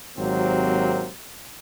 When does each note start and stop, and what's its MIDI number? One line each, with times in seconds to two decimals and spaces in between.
0.18 1.09 32
0.18 1.09 48
0.18 1.09 54
0.18 1.09 58
0.18 1.09 60